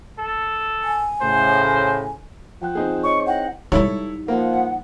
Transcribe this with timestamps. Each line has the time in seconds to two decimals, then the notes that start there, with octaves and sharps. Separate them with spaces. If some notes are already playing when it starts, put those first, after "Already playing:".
0.19 A4
0.83 G#5
1.21 A2 C#3 C5
2.62 F3 F#5 G5 F#6
2.75 C4 D#4 G#4
3.03 C#5 D#5 C#6
3.26 E4 F#5 G5 A#6
3.72 G3 D#4 E4 A4 C#5
4.28 F3 A#3 F#5